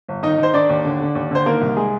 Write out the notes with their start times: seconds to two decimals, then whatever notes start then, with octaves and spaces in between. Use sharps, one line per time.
0.08 G1
0.23 D#3 D#4 D#5
0.38 D#3 C5
0.54 D#3 D4 D5
0.69 D#2
0.85 D3
1.00 D3
1.15 D#2
1.31 D3 C5
1.46 D#3 A#3 A#4
1.61 C2
1.76 G#3 G#4